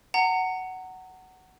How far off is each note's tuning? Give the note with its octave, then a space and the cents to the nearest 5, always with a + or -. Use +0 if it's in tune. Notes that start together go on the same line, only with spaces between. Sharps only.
F#5 +10 A#5 -30